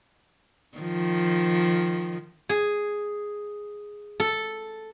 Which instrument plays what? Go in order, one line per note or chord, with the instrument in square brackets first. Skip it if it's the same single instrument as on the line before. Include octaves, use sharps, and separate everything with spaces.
[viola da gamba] D#3 F3
[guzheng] G#4
A4